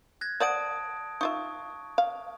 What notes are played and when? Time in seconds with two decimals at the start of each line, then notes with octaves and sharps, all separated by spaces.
0.21 F#6 G#6 A#6
0.40 C5 D5 F#5 A5 D#6 D7
1.21 D#4 F4 E5 C#6
1.98 F5